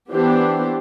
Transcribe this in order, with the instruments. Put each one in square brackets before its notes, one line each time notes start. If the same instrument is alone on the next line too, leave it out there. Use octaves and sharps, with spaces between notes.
[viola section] E3 B3 D4 G4 C5